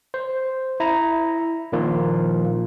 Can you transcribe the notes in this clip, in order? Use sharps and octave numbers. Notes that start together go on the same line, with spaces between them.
C5
E4 A#5
A#2 D#3 F3 A#3 F4